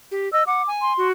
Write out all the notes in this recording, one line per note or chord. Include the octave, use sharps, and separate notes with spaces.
G4
D#5 E6
F#5 D6
G#5
C6
F#4